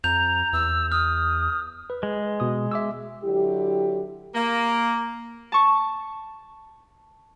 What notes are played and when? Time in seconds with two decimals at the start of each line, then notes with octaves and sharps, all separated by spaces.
0.04 F2 A#5 G6 F7
0.53 E2 E6
0.92 D#6 F6
1.90 B4
2.03 G#3
2.40 B2 D#6
2.71 E5 D6 E6
3.24 D3 F#3 E4 G4
4.35 A#3
5.52 A5 C#6